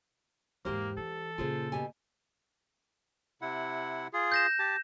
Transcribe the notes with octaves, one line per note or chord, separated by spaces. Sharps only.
E2 G#2 A#3 G4 C5
E3 A4
A#2 C#3 F4 G#4 C5
B2 G4 G#5
C3 E4 F#5
F4 G#4
G6 A#6 E7
G4 A5